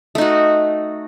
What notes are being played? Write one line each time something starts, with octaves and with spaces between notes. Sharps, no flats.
A3 D#4 F#4